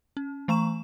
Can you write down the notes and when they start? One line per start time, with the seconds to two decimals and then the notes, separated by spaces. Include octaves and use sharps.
0.17 C#4
0.48 E3 A3 A#5 C#6 E7